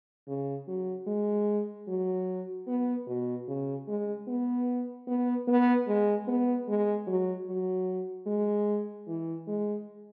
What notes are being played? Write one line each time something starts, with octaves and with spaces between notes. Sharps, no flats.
C#3
F#3
G#3
F#3
B3
B2
C#3
G#3
B3
B3
B3
G#3
B3
G#3
F#3
F#3
G#3
E3
G#3